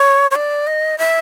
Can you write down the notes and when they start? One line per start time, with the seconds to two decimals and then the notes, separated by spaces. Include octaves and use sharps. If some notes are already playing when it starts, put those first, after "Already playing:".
Already playing: C#5
0.31 C#5
0.36 D5
0.67 D#5
0.98 E5